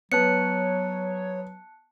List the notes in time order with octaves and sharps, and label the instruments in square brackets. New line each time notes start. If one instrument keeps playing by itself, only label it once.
[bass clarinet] F#3 [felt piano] B3 [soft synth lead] C#5 [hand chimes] A5 F#6 C#7